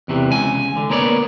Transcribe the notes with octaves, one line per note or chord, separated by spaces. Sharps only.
E2 C3 E3
C#2 G#5
D3
A#3 B3 C#5 D5